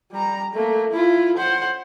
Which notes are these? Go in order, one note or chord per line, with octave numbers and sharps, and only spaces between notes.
G3 A#5
A3 A#3
E4 F4
C5 F#5